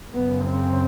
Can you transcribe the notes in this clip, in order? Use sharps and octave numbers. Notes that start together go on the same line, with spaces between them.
F#2 C#3 B3
C4